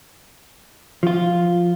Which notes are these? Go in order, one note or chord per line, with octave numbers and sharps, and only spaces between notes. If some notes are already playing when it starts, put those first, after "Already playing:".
F3 F4